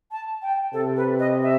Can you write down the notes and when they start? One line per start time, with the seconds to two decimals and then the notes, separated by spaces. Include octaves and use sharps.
0.11 A5
0.42 G5
0.73 C3 A4
0.96 B4
1.19 D#5
1.42 E5